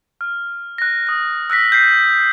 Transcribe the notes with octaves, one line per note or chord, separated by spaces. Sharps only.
F6
F#6 A#6
D#6 F#6
E6 F#6 A#6 B6
G6 B6 C7